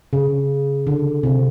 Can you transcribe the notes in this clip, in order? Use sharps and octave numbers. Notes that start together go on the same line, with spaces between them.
C#3
D3
C3